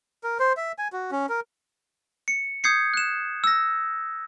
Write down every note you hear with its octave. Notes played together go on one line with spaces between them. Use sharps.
A#4
C5
E5
G#5
F#4
C#4
A#4
C#7
D#6 G6 G#6 C7 C#7
F#6 E7
E6 A#6